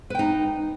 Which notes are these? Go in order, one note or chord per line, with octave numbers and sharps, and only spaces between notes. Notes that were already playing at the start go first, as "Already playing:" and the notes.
D#4 B4 G5